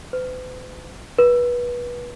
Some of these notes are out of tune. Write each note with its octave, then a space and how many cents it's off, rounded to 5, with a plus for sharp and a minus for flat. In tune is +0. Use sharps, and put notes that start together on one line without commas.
B4 +45
B4 -25